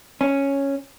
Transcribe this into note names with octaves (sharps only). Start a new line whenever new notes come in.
C#4